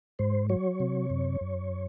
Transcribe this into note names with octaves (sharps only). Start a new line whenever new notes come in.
G#2 C5
F#3 C#5
C3
F#2
F#2